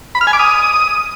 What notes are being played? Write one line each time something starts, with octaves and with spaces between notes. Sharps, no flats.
B5
F6
G#5
D6
D#6